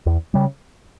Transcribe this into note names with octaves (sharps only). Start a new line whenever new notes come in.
E2
C#3 G3